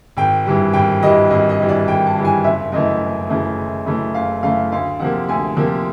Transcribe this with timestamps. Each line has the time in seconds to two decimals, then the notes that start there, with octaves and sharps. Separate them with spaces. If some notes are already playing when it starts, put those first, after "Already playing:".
0.17 G#1 G5
0.46 G2 E3 G3
0.73 G#1 G5
1.02 G2 E3 G3 D#5
1.31 G#1 D#5
1.49 D#5
1.60 G2 E3 G3
1.69 D5
1.87 G#1 G5
2.06 A5
2.16 G2 E3 G3
2.25 G#5
2.44 F#1 E5
2.72 F#2 C#3 E3 A3 D#5
3.02 F#1
3.29 F#2 C#3 E3 A3
3.58 F#1
3.86 F#2 C#3 E3 A3
4.14 F#1 F5
4.43 F#2 C#3 E3 A3 F5
4.72 D2 F5
4.99 C3 F3 A#3 F#5
5.29 D2 G#5
5.57 C3 F3 A#3